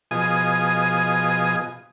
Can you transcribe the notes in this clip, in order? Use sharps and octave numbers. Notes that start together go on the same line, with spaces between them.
B2 F3 G#4 D#5 G#5 D#6